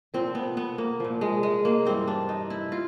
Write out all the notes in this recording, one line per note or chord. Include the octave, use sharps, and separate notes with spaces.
A#2 F3 C4
B3
B3
A#3
A#2 F3
G#3
G#3
A#3
G2 E3 G3 C4
D4
D#4
E4
F4